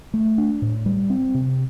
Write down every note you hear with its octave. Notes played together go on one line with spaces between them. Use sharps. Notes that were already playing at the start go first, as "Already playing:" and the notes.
A3
D4
A2
G3
C4
C3